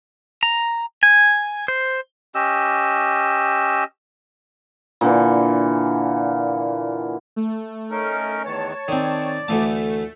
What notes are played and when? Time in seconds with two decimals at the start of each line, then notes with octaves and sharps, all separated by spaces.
0.43 A#5
1.03 G#5
1.68 C5
2.35 C#4 G4 D#5 E6
5.01 A#2 D3 E3
7.36 A3
7.91 C#4 D#4 A#4
8.44 E2 D#3 E3 C#5 A5
8.88 D#3 C4 D5
9.48 D2 E3 A3 A5